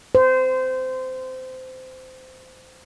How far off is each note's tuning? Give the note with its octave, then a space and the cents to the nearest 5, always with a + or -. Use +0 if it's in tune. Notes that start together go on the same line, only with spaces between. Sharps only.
C5 -20